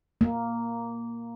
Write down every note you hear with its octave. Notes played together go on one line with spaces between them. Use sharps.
A#3